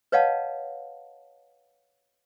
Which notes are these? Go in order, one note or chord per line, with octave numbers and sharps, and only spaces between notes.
B4 C#5 D#5 F5 F#5 A5